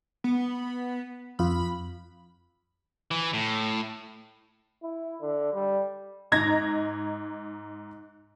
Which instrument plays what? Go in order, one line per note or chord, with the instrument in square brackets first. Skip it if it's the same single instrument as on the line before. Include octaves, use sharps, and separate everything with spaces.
[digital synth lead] B3
[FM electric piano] F2 F4 [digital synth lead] B5
[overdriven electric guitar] E3
A2
[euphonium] E4
D3
G3
[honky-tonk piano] G#2 D#4 A#5 G#6 A#6